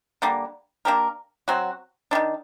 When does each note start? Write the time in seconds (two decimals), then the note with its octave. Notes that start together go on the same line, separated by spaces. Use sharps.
0.22 D3 G3 A#3
0.85 A#3 D4 G4 A#4
1.48 F#3 C4 F#4
2.11 G3 D4
2.15 D#3